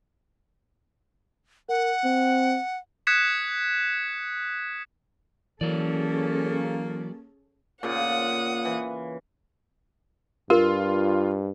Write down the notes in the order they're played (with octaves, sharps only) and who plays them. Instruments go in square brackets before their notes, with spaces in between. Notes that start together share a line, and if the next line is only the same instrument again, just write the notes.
[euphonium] A#4 [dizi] F#5
[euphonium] C4
[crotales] D#6 F#6 G#6 B6 C#7 E7
[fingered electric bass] E3 [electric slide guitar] F#3 D5 [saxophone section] A#3 [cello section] C#4 G#4 A4
[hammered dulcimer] A#2 C#3 F4 [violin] F#5 D#6
[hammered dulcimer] E3
[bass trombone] G2 [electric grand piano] F4 [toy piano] A#4